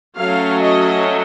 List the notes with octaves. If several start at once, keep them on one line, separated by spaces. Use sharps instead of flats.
F#3 A3 C#4 F5
D#5